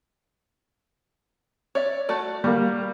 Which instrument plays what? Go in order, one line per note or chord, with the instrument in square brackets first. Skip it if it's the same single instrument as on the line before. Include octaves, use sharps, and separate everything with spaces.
[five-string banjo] C#5 D5 E5
A3 F#4 D5
[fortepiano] G3 A#3 [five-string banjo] F#4